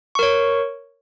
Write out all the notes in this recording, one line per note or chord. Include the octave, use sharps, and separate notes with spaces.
A#4 C#5 C#6